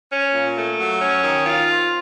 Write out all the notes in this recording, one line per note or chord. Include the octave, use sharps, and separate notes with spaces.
C#4
A#2
A3
F#3
C#4
D#3
F4
C4